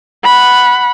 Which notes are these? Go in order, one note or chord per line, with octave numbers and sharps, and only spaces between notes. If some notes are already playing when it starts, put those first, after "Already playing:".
F#5 B5